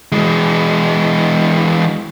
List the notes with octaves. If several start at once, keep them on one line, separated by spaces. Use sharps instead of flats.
E3 G#3